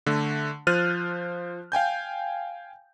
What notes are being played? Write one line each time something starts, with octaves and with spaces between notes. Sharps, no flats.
D3 A3
F3 C5 F6 F#6 A6 D#7
F5 G5 G#5 G6